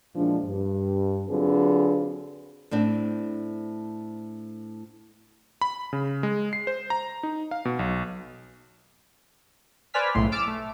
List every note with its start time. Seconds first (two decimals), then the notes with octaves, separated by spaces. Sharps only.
0.15 E2 A#2 F3 G#3 D4
0.45 G2
1.29 D3 F#3 C4 F4 G#4 B4
2.71 A2 C4 D4
5.61 B5
5.93 C#3
6.23 G#3
6.53 C7
6.67 C5
6.90 A#5
7.23 D#4
7.51 F5
7.65 B2
7.79 B1
9.94 B4 C5 D5 G#5 F6 B6
10.14 B1 A2 C#3 A3 C6
10.32 D6 E6 F6 A6 D7
10.47 A3